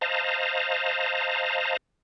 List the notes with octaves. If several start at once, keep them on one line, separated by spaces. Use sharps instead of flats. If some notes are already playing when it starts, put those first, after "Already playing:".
C5 D#5 F5 A5 A#5